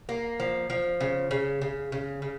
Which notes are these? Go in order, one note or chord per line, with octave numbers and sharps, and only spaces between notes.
A#3
F3
F3
C#3
C#3
C#3
C#3
C#3